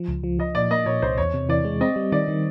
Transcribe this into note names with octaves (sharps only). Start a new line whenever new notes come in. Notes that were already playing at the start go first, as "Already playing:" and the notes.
Already playing: F3
C#2
F3
F3 D#5
A#2 D5
A#3 D#5
A#2 C#5
C2 C5
E2 C#5
C3
E3 D5
G#3
C4 D#5
G3
D#3 D5
D#3